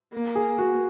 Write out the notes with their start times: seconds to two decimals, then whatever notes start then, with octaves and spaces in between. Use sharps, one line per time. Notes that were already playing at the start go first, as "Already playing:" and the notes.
0.13 A#3
0.35 G#4
0.59 F#4